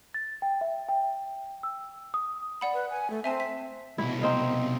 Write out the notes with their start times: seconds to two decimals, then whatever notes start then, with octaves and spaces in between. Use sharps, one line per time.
0.14 A6
0.42 G5
0.61 E5
0.89 G5
1.63 E6
2.14 D#6
2.61 D5 F#5 B5
2.74 B4
2.90 G#5
3.10 A3
3.24 C4 E5 G#5 A5
3.40 B6
3.98 C2 B2 E4
4.21 C4 D#4 F5